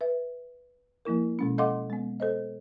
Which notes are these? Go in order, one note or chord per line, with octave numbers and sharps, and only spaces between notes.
B4 E5
F3 A#3 E4 A#4
B2 G#3 C#4
A4 D#5 F5 F#5 C6 D6
G#3 B3
A4 C5 D#5